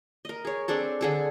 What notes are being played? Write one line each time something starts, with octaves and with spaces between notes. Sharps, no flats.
A#4 D#5
G#4 C#5
C4 D4 G#4 A4
D3 G#4 A4